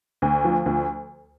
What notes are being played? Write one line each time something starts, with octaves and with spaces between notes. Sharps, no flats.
D2
F3
D2